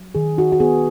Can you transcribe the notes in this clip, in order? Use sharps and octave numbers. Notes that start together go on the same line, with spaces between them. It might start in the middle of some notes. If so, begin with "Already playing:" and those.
Already playing: F#3
D#3 G#4
D#4 F#4
F#4
B3 G#4